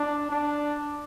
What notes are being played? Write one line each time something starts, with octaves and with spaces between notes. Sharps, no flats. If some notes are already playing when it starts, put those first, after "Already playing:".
Already playing: D4
D4